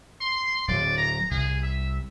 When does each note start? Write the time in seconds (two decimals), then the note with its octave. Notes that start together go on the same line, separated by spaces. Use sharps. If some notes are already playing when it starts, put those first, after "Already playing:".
0.21 C6
0.68 D1 F#3 D5
0.97 A#5
1.31 C2 G#4
1.63 E5